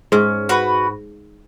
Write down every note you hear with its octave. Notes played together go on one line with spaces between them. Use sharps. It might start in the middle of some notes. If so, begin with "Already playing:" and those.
G#2 C#4
F#4 B4